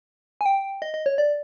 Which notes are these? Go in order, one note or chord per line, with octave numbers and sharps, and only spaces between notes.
G#5
G5
D#5
D#5
C#5
D5